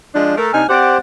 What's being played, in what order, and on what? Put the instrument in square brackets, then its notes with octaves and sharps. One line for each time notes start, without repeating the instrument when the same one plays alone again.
[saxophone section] F3 G#3 D4
A3 A4 A#4
[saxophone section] C3 D4 D#4 [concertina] G#5 F6
[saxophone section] C4 D5 F#5 [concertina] G4 C5